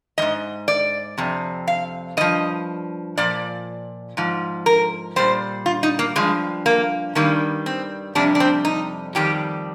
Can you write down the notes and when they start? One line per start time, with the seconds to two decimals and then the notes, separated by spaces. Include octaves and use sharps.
0.18 G3 D#5
0.22 G#2
0.68 D5
1.18 F2 C3
1.68 F5
2.17 G2 F3 D#5
3.18 A#2 F3 D5
4.17 G#2 F3
4.66 A#4
5.16 A#2 G3 C5
5.66 F4
5.83 D#4
5.99 A#3
6.16 G2 F3 G#3
6.66 A#3
7.15 G2 D#3 G3 A#3
7.66 C4
8.15 F2 C3 G3 D4
8.35 D4
8.40 C4
8.65 D#4
9.15 F2 D#3 G3 G4